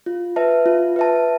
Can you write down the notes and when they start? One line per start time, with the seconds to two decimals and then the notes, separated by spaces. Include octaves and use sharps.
0.06 F4
0.36 B4 E5 A5
0.66 F4
0.96 B4 E5 A5